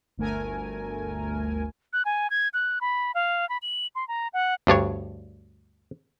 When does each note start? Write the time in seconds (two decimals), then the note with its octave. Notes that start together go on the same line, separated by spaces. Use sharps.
0.17 G1 D2 A3 A#4 G#5
1.93 F#6
2.05 G#5
2.30 G#6
2.54 F#6
2.81 B5
3.15 F5
3.49 B5
3.62 F#7
3.95 C6
4.08 A#5
4.33 F#5
4.67 D2 G2 D4 C#5